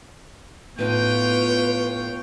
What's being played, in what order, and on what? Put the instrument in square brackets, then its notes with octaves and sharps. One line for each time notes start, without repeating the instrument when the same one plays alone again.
[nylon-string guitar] A2 C4 D#4 [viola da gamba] B3 F4 C#5 [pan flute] B4 [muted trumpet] G5